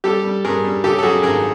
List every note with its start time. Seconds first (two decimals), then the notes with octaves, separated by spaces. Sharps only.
0.04 G3 G4 A4
0.24 G3
0.45 G2 G#4 A#4
0.64 G3
0.84 C#3 G4 A4
0.98 A4
1.03 F#2 F#4 G#4
1.23 G#1 G#4 A#4